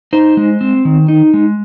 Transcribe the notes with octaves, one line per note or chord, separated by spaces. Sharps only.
D#4 C5
G#3
C4
D#3
D#4
G#3